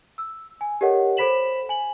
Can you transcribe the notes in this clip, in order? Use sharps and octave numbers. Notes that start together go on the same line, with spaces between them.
E6
G#5
G4 A4 A#4 C#5 D#5 F#5
A4 C5 B5 B6 E7 F#7
G#5 F#7